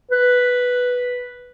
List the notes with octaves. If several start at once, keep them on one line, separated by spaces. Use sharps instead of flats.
B4